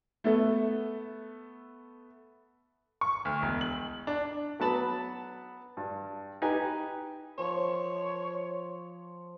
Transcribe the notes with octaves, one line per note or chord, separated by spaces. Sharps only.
A3 B3 A4
C#6
D2
E1
F#7
D4
F#3 B3 A5 B5
G2
D#4 G4 B4 G#5
F3 C#5